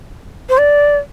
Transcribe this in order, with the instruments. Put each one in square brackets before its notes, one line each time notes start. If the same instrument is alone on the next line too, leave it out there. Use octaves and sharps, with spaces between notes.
[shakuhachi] C5
D5